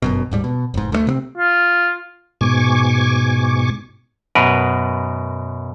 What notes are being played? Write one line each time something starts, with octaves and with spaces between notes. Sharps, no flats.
G1 F#2 B2
D#1 G#2 G3
B2
F1 G#2
D2 C3 A3
C3 A#3 C4
F4
G#2 B2 G#5 C#6 D6
F#2 B2 A#4 B4